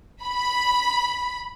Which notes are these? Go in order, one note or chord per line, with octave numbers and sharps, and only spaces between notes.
B5